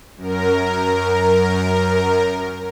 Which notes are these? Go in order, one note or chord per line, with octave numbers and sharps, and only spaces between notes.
F#2 A#4